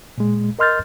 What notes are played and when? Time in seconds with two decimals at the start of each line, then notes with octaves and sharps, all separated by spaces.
0.18 A#2 G#3
0.59 A#4 D#5 C6 F6 G6 A6